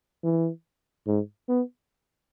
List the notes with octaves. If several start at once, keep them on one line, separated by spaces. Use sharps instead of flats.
E3
G#2
B3